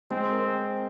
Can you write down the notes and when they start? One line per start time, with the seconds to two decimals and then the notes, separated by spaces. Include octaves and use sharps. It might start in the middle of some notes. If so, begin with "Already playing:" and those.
0.11 G#3 C4
0.32 A#4
0.54 A#4